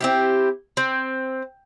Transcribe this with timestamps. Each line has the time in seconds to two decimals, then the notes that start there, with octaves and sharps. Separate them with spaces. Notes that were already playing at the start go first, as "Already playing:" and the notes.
0.01 C4 E4 G4
0.77 C4